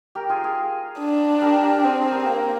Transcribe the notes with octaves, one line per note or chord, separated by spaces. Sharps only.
G4 A#4
F4 G#4
F4 G#4
D4
G4 A#4
G4 A#4
C4 G#4 C5
G#4
G4 A#4
A#3